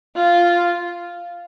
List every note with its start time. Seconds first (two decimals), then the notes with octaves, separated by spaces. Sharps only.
0.16 F4